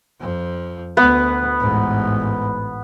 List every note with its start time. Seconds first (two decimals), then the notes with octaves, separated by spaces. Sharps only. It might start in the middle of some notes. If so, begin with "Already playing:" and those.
0.20 F2 F3
0.97 D2 B3
1.60 A1 G#2